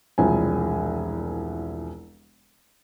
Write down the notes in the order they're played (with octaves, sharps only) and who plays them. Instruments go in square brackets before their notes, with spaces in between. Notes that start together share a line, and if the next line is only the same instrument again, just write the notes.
[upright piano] E1 C2 F3 G#5